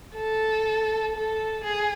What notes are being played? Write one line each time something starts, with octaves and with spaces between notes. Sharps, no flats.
A4
A4
G#4